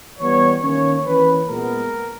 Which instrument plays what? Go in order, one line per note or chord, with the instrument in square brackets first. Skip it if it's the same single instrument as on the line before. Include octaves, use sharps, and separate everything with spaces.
[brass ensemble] E3 G3 B3 C#5
D#3 A#3 C#4 C#5
E3 A#3 C#4 B4
A#2 G#3 B3 A#4